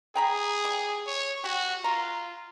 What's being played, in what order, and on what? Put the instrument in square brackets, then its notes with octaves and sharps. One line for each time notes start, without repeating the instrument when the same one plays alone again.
[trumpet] G#4 [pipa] G5 A#5 B5
[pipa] G3
[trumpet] C#5
[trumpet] F#4 [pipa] G4
[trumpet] F4 [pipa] A#5